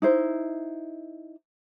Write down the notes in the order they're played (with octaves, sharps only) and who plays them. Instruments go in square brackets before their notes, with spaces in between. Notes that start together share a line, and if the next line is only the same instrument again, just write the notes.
[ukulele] D#4 E4 C5